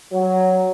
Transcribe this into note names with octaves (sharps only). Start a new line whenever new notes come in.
F#3